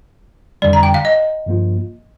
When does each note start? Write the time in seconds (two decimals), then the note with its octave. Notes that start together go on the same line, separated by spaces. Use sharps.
0.62 F2 D3 G3 D5
0.73 A#5
0.83 G5
0.94 F5
1.05 D#5
1.46 G2 F3 A#3 F4